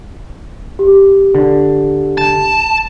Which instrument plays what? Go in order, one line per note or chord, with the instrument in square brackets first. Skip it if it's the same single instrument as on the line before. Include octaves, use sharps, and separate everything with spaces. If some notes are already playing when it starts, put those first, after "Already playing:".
[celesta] G4
[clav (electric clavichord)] D3
[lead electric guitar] A5